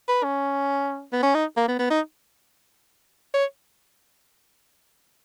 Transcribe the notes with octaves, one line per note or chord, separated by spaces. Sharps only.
B4
C#4
B3
C#4
D#4
A#3
B3
B3
D#4
C#5